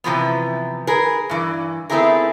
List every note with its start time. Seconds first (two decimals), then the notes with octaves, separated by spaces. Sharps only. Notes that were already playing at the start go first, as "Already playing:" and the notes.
0.04 C3 E3 F3 B3
0.87 G#4 A#4 B4
1.30 G2 E3
1.90 A3 B3 C4 E4 G#4 A#4